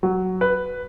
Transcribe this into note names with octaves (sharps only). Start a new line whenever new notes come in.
F#3
B4